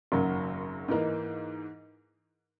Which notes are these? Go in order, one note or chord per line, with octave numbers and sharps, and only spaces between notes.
G#1 F#2 C#3 F#3 A#3
G#2 E3 A#3 D#4